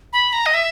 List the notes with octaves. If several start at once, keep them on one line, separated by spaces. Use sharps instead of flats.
B5
A#5
D#5
E5